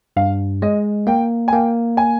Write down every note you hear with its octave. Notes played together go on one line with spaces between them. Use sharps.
G2 F5
G#3 D#5
A#3 G5
G#5
A#3 G5
G#5